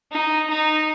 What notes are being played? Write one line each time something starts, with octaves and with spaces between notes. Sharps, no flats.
D#4
D#4